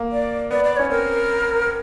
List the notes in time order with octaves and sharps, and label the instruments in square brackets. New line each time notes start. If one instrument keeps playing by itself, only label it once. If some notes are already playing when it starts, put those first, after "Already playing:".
Already playing: [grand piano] A#3
[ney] D5
[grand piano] B3 [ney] D5
[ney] D5
[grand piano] C#4 [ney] C#5
[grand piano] C4 [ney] A#4